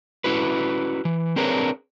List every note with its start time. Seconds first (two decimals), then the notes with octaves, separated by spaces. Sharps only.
0.24 C#4 E4 F#4 B4
1.05 E3
1.36 C4 D4 G#4 A#4 B4 C#5